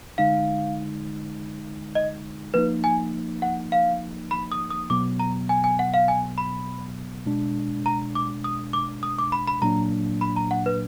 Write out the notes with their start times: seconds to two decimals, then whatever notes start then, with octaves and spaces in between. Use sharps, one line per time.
0.18 D3 G#3 D#4 F5
1.95 D#5
2.54 F3 A#3 D#4 B4
2.84 G#5
3.42 F#5
3.72 F5
4.31 B5
4.52 D#6
4.71 D#6
4.90 B2 F#3 B3 D6
5.19 A#5
5.49 G#5
5.64 G#5
5.79 F#5
5.94 F5
6.08 G#5
6.38 B5
7.26 B2 G#3 D4
7.86 A#5
8.15 D6
8.44 D#6
8.73 D6
9.03 D#6
9.19 D6
9.32 B5
9.47 B5
9.62 A#2 F#3 A#3 D4 A#5
10.21 B5
10.36 A#5
10.51 F#5
10.66 B4